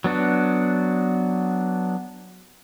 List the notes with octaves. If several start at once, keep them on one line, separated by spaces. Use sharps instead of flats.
F#3 B3 D4 F#4